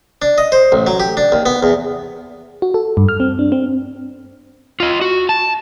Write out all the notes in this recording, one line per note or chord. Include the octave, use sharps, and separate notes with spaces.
D4
D#5
C5
A1
F#3
G4
D4
D#2
B3
E2
F#4
A4
G2
F6
C4
D4
C4
F4 D#5
F#4
A5